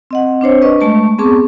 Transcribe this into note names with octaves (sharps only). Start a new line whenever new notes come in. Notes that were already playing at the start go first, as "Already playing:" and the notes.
C4 D#5 F#5
C4 D4 C5 C#5
D4 B4 D#5 C#6
G#3 A3 A5 C#6
B3 C4 G#4 A5 C#6 D6